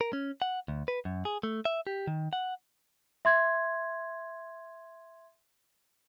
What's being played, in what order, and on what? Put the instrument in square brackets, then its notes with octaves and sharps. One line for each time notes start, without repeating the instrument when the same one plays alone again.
[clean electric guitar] A#4
C#4
F#5
D2
B4
F#2
G#4
A3
E5
G4
D#3
F#5
[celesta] E5 C6 G#6